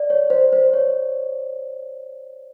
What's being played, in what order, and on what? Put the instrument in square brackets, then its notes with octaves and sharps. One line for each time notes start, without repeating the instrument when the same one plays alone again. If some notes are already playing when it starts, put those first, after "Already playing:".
Already playing: [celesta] D5
C#5
C5
C5
C#5